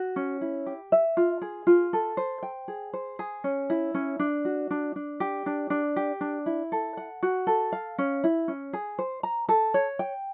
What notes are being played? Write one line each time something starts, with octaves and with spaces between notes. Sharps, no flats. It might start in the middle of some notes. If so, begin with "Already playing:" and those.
Already playing: F#4
C#4
E4
G4
E5
F4
G#4
F4
A4
C5
G5
G#4
C5
G#4
C#4
E4
C#4
D4
F#4
D4
D4
G4
D4
D4
G4
D4
E4
A4
F#5
F#4
A4
F5
C#4
E4
C#4
G#4
C5
A#5
A4
C#5
G5